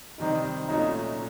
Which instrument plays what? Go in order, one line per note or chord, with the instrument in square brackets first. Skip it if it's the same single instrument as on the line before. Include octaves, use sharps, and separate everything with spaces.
[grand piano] C3 D#3 G3 C4 [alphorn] D#4
[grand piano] A#2 F#3 A3 C#4 F#4 [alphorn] D#4